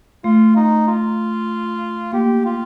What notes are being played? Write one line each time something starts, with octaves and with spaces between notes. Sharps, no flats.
A3 F4
D#4
F4
A#3 G4
F4